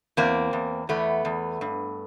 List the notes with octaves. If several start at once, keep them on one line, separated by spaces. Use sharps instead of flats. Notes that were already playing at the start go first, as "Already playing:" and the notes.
E2 A#3 C4
E2
E2 A3 B3
E2
G2